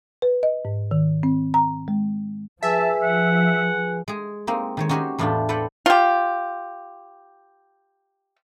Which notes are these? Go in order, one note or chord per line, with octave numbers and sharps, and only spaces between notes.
B4
D#5
G#2
D#3
C4
A#5
G#3
F3 G#4 B4 E5 G#5 A5
F#5
G#3 G#4
G#3 A#3 C4 D#4
D#3 G#3 C#5
C#4 D#4 F#4 G4 C5 C#5
E2 A2 E3 D4 F4 G5
A4 B4 C5 D5 F#5 G5
F4 G4